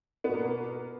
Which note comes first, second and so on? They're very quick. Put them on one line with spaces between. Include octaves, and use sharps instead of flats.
B3 B2 A#3